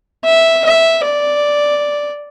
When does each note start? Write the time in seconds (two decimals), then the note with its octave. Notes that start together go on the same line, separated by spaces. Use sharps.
0.24 E5
0.64 E5
1.03 D5